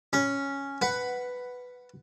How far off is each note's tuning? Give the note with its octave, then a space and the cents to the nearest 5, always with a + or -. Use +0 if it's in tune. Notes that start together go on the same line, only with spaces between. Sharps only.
C#4 +0 B5 -30
B4 +5 F#5 +5